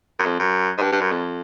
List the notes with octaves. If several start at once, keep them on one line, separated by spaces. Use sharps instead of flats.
F#2
F2
F#2
G#2
G2
G2
F#2
F2